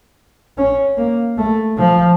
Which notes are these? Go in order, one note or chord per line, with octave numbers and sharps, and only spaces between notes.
C#4
A#3
A3
F3